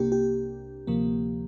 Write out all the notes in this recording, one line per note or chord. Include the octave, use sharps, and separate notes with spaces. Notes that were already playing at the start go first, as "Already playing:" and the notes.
Already playing: C2 C3 A#3 D4 G4
G4
D2 C3 F3 A#3